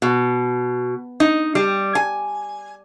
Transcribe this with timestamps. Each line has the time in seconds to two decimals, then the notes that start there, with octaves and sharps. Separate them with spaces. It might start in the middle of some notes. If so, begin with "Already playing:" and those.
0.02 B2
1.20 D#4
1.55 G3
1.95 G#5